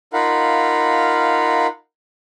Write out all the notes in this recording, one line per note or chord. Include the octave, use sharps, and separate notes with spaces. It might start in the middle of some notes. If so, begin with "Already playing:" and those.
D#4 F4 A#4 F5 F#5 B5